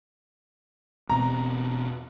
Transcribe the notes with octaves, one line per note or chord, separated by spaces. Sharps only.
E1 B2 C4 A#5